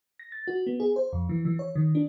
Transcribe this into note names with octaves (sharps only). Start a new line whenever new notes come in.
A#6
A6
F#4
B3
G#4
C5
F2
E3
E3
C#5
D#3
D4